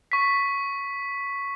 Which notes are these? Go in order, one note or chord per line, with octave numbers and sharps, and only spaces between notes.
C#6 B6